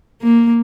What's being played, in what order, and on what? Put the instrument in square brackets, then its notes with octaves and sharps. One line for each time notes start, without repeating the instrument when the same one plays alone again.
[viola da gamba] A#3